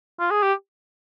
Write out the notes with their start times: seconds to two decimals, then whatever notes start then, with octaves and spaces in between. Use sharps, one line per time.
0.19 F4
0.31 G#4
0.43 G4